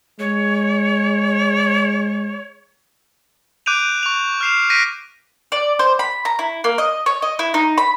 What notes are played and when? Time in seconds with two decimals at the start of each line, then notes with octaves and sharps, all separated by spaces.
0.20 G#3 C#5
3.66 D6 F#6 G6 D7 D#7 F7
4.03 C#6 F7
4.41 F6 G6 C7 E7 F7
4.70 G6 A#6 B6 D7 D#7
5.52 D5
5.79 C5
5.99 B5
6.25 A#5
6.39 E4
6.64 A#3
6.78 D#5
7.06 C#5
7.22 D#5
7.39 E4
7.54 D#4
7.78 B5